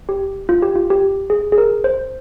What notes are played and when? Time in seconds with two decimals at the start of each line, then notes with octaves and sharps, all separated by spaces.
0.09 G4
0.49 F4
0.62 G4
0.75 F4
0.90 G4
1.30 G#4
1.52 G#4
1.58 A#4
1.84 C5